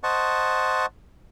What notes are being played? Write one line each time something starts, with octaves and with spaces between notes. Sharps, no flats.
C5 D#5 F#5 A5 C#6